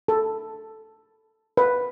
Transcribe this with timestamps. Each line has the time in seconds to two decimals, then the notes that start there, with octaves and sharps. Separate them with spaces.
0.08 A4
1.57 B4